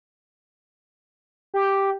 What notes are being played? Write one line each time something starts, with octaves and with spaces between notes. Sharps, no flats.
G4